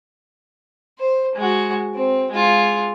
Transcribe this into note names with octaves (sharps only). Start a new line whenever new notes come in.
C5
G#3 F#4
C4
G#3 F4